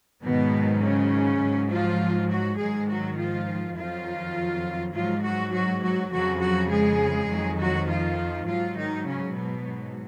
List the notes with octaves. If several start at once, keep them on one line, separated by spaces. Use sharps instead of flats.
G#2 B2 D#3 F#3 B3
C#3 C#4
G#2 F#3
F3 F4
F#3 F#4
G#2 D#3 F#3 G#3 G#4
F#3 F#4
F3 F4
F2 D#3 F3 F#3 F4
G#2 F3 F#3 F4
F#3 F#4
F#3 F#4
F#3 F#4
F2 C#3 F3 F#3 F#4
F#3 F#4
G#3 G#4
F2 D#3 F#3
F#3 F#4
F3 F4
G#2 F3 F#3 F4
D#3 D#4
C#3 C#4
B2 B3
G#2 F#3